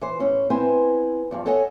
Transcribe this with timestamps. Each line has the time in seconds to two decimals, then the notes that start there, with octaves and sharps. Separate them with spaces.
0.01 E3 C5
0.19 A2 C#4 E5
0.50 B3 C4 E4 C5 G#5
1.31 E2 G2 F3
1.46 A4 C#5 D#5 E5 F#5 G#5